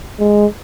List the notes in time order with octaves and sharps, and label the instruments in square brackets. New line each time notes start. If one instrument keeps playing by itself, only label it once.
[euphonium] G#3